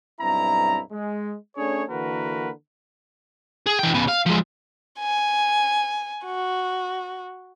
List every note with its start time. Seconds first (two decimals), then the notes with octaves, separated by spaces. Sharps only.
0.21 B1 G2 C4 E4 A#5
0.92 G#3
1.57 A3 C#4 D4 G#4 C#5
1.89 D3 E3 A#3 F#4 A#4 B4
3.66 G#4
3.79 E3 G5
3.94 C#3 B3
4.08 F5
4.26 F3 G#3
4.99 G#5
6.26 F#4